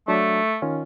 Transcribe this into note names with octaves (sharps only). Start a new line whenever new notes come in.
F#3 A3 D4
D#3 C#4 F4